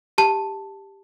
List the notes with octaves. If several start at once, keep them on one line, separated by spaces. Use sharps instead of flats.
G4 A5